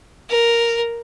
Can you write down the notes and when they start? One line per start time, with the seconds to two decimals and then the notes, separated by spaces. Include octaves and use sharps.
0.30 A#4